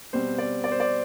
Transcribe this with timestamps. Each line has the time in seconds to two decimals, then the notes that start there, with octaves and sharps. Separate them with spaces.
0.13 B2 G3 C4 C5
0.38 D5
0.64 D5
0.72 C5
0.80 D5